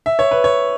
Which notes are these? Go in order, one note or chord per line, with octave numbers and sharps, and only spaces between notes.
E5
C#5
B4
C#5